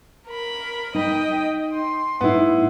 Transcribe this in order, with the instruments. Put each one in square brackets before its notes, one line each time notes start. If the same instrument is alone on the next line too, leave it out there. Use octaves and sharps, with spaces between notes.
[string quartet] A#4 B5
[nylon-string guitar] D#4 [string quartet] D#5 G5
[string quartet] C6
[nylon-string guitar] A2 D#4 [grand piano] B3 E4